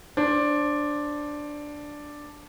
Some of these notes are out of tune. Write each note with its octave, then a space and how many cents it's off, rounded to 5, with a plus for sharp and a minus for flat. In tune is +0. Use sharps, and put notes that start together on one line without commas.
D4 +0 C5 +25